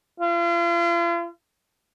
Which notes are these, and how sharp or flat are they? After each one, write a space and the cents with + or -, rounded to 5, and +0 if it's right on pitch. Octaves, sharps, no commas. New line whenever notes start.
F4 -40